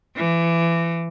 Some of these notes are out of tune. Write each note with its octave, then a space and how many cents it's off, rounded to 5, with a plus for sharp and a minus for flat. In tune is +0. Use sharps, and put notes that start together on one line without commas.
E3 +25